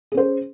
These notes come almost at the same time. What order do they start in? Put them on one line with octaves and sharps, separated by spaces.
G#4 C#4 C5